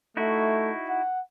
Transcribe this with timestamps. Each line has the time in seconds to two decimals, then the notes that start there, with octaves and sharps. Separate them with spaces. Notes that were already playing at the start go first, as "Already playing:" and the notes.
0.17 A3 D#4 E4 F#4
0.89 F#5